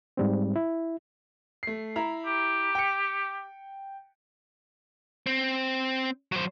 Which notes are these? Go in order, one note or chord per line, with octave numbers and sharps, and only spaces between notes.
G#2 G3 C4
E4
A3 C7
E4 A#5
G4
G5 C#7
C4
F#3 C5